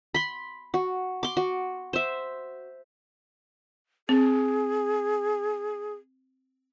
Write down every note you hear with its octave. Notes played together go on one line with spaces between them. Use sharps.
B5 C6
F#4
C6 D6
F#4
C5 E5
C4 G#4